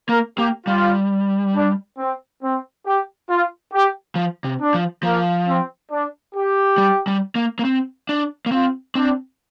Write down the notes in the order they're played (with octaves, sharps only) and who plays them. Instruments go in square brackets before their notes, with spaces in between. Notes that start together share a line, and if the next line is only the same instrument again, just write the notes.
[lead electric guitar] A#3 [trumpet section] A#4
[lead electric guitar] A#3 [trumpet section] G4
[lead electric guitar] G3 [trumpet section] F4
[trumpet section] D4
C4
C4
G4
F4
G4
[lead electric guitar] F3
C3
[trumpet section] D4
[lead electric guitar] F3
[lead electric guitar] F3 [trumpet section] A#3
[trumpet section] C4
D4
G4
[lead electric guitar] G3
G3
A#3
A#3
C4
D4
A#3
[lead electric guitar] C4 [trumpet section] F4
[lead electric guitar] C4 [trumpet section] D4